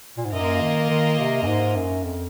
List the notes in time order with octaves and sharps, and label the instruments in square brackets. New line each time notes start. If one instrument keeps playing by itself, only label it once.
[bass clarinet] A#2
G#2
[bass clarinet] F#2 [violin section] A#3 F4 A#4 D#5
[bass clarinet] D#3
D#3
C3
F#2
G#2
F#2
F2